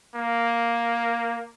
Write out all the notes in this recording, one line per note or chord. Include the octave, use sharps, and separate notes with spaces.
A#3